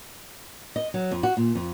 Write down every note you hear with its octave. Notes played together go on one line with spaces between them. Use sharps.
D#5
F#3
F2
F#4
A#2
F2